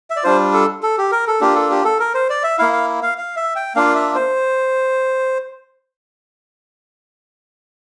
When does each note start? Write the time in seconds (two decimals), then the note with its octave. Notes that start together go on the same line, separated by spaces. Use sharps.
0.10 E5
0.17 D5
0.23 G3 D4 F4 C5
0.53 A4
0.83 A4
0.98 G4
1.12 A#4
1.27 A4
1.41 A#3 D4 F4 G4
1.55 A4
1.71 G4
1.85 A4
2.00 A#4
2.14 C5
2.30 D5
2.43 E5
2.58 A#3 E4 F5
2.73 F5
3.03 F5
3.18 F5
3.36 E5
3.56 G5
3.75 A#3 D4 F4 F5
3.95 E5
4.15 C5